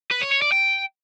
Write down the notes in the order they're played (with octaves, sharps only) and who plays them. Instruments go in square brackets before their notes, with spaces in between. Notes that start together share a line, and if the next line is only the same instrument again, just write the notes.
[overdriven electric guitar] B4
C#5
C#5
D5
G5